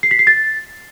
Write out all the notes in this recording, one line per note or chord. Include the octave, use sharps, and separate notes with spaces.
C7
B6
C7
A6